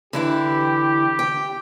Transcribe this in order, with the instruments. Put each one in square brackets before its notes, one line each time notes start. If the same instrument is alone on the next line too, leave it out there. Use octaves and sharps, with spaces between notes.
[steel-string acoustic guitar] D3 E3 E4 [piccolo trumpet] G4
[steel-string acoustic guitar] G5